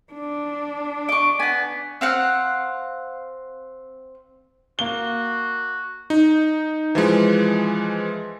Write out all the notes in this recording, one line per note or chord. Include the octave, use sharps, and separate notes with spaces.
D4
D#5 C#6 D6
B3 F#5 G#5
C4 F5 F#5
A#3 F#4 G7
D#4
E3 F3 G#3